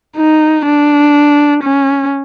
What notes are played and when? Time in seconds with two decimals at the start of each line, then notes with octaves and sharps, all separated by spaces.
0.17 D#4
0.66 D4
1.63 C#4